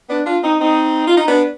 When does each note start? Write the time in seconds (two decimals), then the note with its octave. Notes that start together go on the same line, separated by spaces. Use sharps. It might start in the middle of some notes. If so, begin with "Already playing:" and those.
0.10 B3 D4
0.26 D4 F4
0.44 C4 D#4
0.60 C4 D#4
1.07 F4
1.18 D#4
1.28 B3 D4